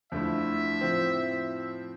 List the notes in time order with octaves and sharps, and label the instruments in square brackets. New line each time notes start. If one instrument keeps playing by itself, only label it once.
[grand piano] F2 D3 A3 E4 [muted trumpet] E5
[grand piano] A2 F3 C4